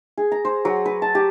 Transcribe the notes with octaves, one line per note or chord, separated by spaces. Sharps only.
G#4
A#5
C5
F#3
B4
A5
G4